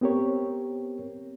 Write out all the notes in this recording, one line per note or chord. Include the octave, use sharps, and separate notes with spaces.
B3 C4 G4 A#4 C#5